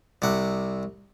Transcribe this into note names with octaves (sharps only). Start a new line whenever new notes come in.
C2 C3 F#5